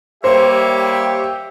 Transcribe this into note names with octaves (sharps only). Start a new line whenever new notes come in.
G3 A#3 G4 C5 C#5 E5